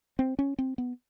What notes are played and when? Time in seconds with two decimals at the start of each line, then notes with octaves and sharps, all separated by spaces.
0.19 C4
0.39 C#4
0.58 C4
0.78 B3